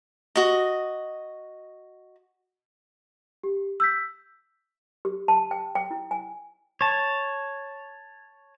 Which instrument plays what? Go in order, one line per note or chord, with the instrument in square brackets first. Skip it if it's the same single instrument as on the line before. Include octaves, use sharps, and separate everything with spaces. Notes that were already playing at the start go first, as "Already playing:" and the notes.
[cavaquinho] F#4 D#5
[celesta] G4
E6 G6 B6
[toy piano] G4
A5
G5
G5
E4
G#5
[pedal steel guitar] C#5 A5